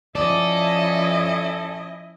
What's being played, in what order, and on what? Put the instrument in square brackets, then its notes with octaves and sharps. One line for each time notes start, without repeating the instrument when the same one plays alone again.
[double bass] F3 C#4 [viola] E4 D#5 [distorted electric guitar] A4 [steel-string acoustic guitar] D5